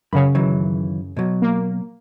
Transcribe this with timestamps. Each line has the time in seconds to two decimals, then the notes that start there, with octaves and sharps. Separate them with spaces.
0.13 F#2 C#3 C#5 B5
0.35 D#3 E3 F#3
1.17 B2 F#3
1.42 A#3